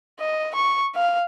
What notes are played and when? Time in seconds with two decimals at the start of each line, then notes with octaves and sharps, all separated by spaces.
0.20 D#5
0.55 C#6
0.95 F5